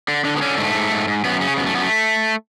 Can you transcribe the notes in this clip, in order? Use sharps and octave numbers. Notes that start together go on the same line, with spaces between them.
D3
D3 D4
B3
D3 C#4
G#2 A3
G#2
G#2
G#2
F#2 B3
C#3 C#4
F#2 B3
A3
F#2 B3
A3